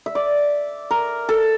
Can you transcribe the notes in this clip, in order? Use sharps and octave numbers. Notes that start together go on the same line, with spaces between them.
E5
D5
A#4
A4